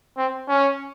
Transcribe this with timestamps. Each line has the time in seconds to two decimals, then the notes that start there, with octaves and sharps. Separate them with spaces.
0.17 C4
0.49 C#4